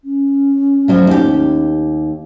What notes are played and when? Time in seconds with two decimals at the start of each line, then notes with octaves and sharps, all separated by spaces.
0.04 C#4
0.88 F3 F#3 A3
1.07 D#2 G4